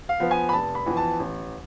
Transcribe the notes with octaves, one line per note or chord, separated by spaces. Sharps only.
F5
F3 B3
G#5
B5
F1 A5
B5
F2 E3 B3
A5
A1